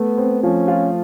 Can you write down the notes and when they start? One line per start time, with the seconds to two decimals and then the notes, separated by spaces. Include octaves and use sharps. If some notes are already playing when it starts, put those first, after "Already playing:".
Already playing: A3 B3
0.18 C4
0.43 F3 C#4
0.68 F4